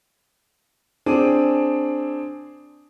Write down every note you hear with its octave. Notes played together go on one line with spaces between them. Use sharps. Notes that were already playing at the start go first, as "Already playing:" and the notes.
C4 D4 G#4 D#7